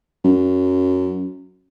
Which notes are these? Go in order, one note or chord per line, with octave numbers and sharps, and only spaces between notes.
F#2